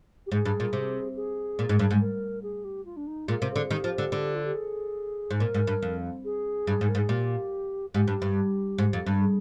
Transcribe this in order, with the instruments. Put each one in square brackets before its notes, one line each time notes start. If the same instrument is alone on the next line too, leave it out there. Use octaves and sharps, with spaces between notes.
[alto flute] G4
[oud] G#2 [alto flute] G#4
[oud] G2
A#2
C3
[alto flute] G#4
[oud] A#2
G#2
G2
G#2
[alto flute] A#4
G#4
G4
F4
D4
D#4
[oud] A#2 [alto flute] G#4
[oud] C3 [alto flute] A#4
[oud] D3 [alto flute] G#4
[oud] D#3 [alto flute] G4
[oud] F3
D3
D3
[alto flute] F4
G4
G#4
[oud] G#2
[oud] A#2 [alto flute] A#4
[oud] G#2
G2
F2
[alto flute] G#4
[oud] G2
G#2
[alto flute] A#4
[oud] G#2
[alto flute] G#4
[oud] A#2 [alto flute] G4
[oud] G#2 [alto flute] G4
[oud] G2
G2
G#2
F2
G2
[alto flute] G#4